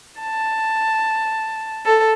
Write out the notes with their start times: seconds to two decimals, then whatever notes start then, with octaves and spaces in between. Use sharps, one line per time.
0.20 A5
1.85 A4